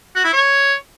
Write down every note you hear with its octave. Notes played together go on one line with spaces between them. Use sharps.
F#4
E4
C#5